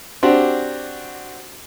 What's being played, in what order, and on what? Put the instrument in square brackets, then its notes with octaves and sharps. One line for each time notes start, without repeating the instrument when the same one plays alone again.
[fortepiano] C4 D4 F#4 G4